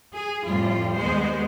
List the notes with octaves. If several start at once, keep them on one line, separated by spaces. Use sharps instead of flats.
G#4
F2 A2 G3 F4
D#2 G#3 B3 C5